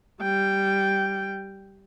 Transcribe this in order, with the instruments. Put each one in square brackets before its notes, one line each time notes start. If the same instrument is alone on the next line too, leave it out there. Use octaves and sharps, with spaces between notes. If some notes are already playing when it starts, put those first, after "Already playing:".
[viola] G3 G5